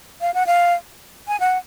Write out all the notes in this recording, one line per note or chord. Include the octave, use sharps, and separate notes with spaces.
F5
F#5
F5
G#5
F#5